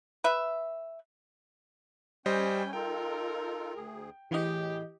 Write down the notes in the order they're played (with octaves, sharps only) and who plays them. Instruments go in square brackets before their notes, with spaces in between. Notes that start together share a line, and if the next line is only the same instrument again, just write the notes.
[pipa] B4 E5
[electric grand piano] G3 C5 D#5 [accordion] C#4 G#5 [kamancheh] G5
[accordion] D#4 F4 A4 [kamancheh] A#4 [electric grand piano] G5
[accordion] D2 G#4
[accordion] A2 G#4 [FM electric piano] E3 D#5 [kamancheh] G4